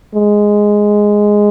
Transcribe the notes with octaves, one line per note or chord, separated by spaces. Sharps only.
G#3